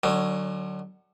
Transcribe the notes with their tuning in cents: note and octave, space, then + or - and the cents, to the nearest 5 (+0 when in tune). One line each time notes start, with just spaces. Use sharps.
D3 +35 F#3 +20 C#4 +0